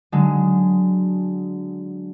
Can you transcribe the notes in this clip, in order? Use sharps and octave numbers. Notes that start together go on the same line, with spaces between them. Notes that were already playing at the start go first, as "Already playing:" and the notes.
D3 F#3 G#3